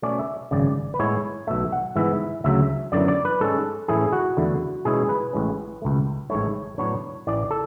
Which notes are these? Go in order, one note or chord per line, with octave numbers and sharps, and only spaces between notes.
B2 A3 C#4 D5
E5
G#1 F#2 C#3 D5
B4
A2 G#3 B3 E4 C#5
B1 B2 A3 E5
F#5
G#2 E3 B3 E5
D2 C#3 F#3 E5
F#2 D3 F#3 B3 E4 D5
D5
B4
G#2 G#3 C#4 A4
A2 E3 A3 C#4 E4 G#4
F#4
E2 D3 A3 E4
B2 G#3 C#4 E4 G#4
B4
A1 A2 G#3 C#4
C#2 B2 A3
A1 G#2 E3 A3 E4 C#5
A2 F#3 B3 D4 C#5
A1 A2 E3 D5
A4